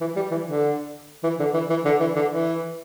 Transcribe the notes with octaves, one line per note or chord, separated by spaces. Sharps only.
E3
G3
E3
D3
E3
D3
E3
E3
D3
E3
D3
E3